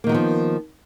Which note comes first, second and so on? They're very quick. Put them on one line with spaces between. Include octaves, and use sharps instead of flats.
A#3 D#3 F#3 B3 F3